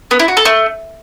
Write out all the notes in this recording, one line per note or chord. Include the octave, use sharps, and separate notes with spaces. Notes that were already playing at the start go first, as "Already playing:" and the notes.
B3
E4
F#4
A4
A3